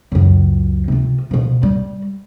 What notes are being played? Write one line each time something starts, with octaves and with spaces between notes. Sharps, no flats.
C#2 F#2
C3 F4
B2 F3
G3